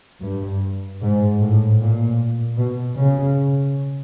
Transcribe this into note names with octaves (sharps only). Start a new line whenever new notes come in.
G2
G#2
A2
A#2
B2
C#3